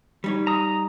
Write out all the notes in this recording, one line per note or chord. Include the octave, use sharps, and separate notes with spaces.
G3 D#4 C#5
A#5 D#6